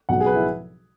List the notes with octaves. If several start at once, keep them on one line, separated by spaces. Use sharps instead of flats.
B1 B2 F#3 F#5
G#4
B4
E4